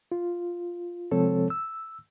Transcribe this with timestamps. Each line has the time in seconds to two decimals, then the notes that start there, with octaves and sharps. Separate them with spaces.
0.12 F4
1.11 C3 F3 G#3 C4 A4 C#5
1.50 E6